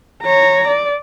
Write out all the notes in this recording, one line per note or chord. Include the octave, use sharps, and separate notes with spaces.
C#5 A#5
D5